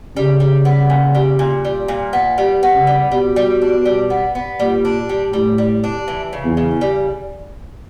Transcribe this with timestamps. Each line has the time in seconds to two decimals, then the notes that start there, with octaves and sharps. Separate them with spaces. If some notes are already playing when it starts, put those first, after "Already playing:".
0.17 C#3 G3
0.40 G3
0.65 B3
0.90 A#2
1.15 G3
1.39 A#2
1.65 G3
1.88 A#2
2.13 B3
2.38 G3
2.63 B3
2.75 C#3
2.87 G3
3.12 B2 G3
3.36 G3
3.62 D4
3.85 G3
4.10 B3
4.35 B3
4.60 A#2 G3
4.85 D4
5.09 G3
5.33 A2 G3
5.58 G3
5.84 D4
6.08 E3
6.33 C#3
6.45 E2
6.57 C#3
6.81 G3